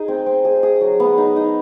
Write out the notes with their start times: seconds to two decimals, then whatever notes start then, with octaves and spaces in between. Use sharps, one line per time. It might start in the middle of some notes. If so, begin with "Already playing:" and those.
Already playing: D#4 G#4
0.08 C4
0.26 C4
0.45 G#4
0.63 G#4
0.81 F#3
1.00 B3
1.18 D#4
1.36 D#4